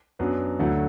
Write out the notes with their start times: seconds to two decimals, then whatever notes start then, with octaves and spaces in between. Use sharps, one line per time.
0.19 F#2 F#3 B3 D4
0.59 D2 D3 F#3 A3 E4